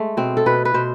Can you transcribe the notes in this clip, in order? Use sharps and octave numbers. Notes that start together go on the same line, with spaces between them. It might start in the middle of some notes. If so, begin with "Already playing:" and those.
Already playing: G#3 A3
B2 C4
A4
B2 B4
B4
B2 C5